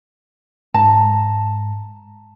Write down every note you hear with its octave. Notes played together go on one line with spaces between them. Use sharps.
G#2 A5 A#5